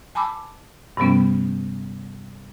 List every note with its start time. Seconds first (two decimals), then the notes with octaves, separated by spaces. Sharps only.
0.15 G#5 A5 B5 D6 E6
0.97 G2 C3 F3 G3 B3 C#4